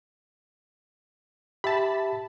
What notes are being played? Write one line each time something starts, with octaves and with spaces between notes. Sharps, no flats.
G4 E5 A5 B5